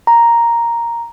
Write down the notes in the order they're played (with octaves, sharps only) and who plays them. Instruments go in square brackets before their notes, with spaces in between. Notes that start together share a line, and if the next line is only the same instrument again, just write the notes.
[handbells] A#5